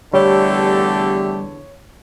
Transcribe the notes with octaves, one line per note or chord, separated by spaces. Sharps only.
E2 D3 G3 A3 G4 C#5